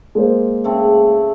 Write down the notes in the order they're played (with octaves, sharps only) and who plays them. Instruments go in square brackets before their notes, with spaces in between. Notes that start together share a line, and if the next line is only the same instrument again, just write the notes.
[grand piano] G#3 A#3 C5
[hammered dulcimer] C#3 A3 C4